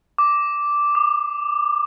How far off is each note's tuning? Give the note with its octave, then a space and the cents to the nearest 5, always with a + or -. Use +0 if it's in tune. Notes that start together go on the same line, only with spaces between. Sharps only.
D6 -5
D6 +40